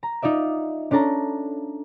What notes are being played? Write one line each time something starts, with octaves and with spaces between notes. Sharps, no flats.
A#5
D#4 F4 D5 E5
C#4 D4 A4 A5 A#5